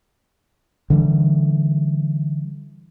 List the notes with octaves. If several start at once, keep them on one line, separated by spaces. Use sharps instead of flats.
D3 E3 G3